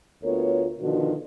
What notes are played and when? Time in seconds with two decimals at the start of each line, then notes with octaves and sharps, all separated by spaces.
0.24 D2 B3 F4 A#4 C#5
0.80 B2 D3 D#3 F3 F#4